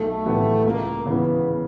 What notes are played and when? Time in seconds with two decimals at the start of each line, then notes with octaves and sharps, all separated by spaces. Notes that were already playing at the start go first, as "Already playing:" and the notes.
Already playing: B1 A3
0.26 A2 E3 G3 B3
0.65 C#2 A#3
1.06 C#3 E3 B3